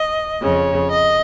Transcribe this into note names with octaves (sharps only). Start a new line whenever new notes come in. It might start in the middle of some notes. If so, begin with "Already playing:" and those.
Already playing: D#5
F2 C#3 C#5
D#5